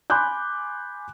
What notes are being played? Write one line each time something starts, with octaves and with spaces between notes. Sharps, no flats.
G#5 B5 C6 D6 F#6 G6